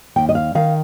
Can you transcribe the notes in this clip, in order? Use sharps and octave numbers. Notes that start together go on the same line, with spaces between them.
D#2 G5
D#5
F5
D#3 F5